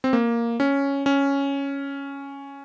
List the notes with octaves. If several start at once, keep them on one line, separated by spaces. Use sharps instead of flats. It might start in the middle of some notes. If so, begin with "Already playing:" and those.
C4
A#3
C#4
C#4